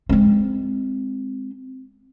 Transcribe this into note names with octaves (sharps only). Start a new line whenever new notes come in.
G#3 C4